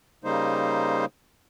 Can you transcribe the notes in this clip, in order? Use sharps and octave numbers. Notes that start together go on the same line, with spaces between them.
C#3 G3 A#3 D#4 C5